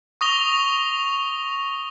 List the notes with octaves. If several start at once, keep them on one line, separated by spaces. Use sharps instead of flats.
C#6 D#6 A#6 F7 G7